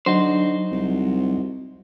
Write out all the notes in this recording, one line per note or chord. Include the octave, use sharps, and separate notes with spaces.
D3 F#3 D#4 F#4 C5
C2